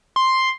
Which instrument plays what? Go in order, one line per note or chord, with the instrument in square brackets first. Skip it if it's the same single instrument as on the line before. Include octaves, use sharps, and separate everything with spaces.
[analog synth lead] C6